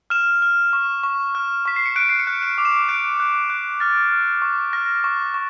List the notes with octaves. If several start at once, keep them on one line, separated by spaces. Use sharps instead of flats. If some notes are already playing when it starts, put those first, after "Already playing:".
F6 E7
F6
C#6
C#6
F6
C#6 B6
C7
C#7
F#6 D7
C7
C#7
F#6
D7
D6
E7
F#6 D7
F#6
F#6
F6 A6
F6
C#6
F6 A#6
C#6
C#6